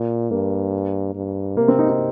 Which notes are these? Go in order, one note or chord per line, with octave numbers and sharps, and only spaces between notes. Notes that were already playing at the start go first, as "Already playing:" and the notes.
Already playing: A#2
G2 A#3
G2
C3 A#3
C4
D#4
D#4